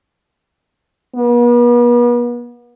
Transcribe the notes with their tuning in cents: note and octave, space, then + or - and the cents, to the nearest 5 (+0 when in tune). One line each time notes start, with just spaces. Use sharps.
B3 -40